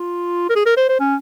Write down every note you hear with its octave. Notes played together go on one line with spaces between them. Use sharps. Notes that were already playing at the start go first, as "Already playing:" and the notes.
Already playing: F4
A#4
G#4
A#4
C5
C5
C#4